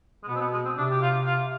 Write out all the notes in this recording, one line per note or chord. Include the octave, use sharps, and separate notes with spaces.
G#3
B2 B3
C4
B3
G#3
C4
C3 D4
G4
F4
F4